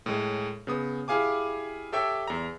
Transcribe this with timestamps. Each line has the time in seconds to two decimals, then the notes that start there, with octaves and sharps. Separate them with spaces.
0.06 A2 G#3
0.67 C#3 B3 D#6
1.08 E4 G4 G#4 F5 G#5 D6
1.93 G4 A4 C#5 E5 G5
2.28 E2 A#5